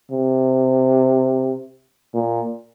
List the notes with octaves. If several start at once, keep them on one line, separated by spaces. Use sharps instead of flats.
C3
A#2